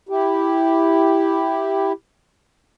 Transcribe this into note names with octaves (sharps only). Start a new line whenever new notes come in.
E4 G4